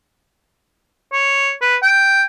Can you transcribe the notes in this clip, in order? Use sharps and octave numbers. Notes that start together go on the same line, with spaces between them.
C#5
B4
G5